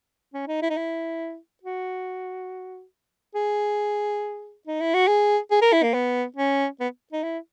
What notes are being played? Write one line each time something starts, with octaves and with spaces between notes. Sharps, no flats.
C#4
D#4
E4
D#4
E4
F#4
G#4
D#4
E4
F#4
G#4
G#4
A#4
E4
A#3
B3
C#4
B3
D#4
E4